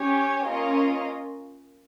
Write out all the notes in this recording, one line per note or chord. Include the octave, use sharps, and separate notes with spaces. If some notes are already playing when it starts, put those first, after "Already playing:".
Already playing: C#4 G4 C#5 G#5
A#3 C#4 F4 A#4 D#5